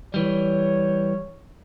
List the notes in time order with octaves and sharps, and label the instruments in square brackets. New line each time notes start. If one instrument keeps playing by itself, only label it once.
[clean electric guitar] E3 G3 [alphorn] C#5